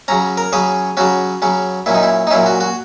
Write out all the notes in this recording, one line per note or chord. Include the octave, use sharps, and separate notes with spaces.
C#3 F#3 C#4 A#5
A#4
C#3 F#3 C#4 G#4
C#3 F#3 C#4 F#4
C#3 F#3 C#4
A#2 F#3 C#4 E4
D#4
E4
D#4
A#2 F#3 C#4 E4
F#4
F#4